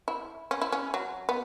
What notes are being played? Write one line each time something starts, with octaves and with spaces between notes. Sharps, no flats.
E4
C#4
E4
C#4
F#3
B3